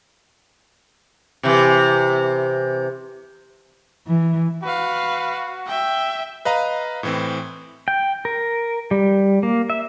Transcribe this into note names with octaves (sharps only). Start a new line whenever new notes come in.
C3 E3
E3
F#4 B4 F5
E5 G5
B4 D#5 F5 A#5
A2 E3 C4
G5
A#4
G3
A#3
E5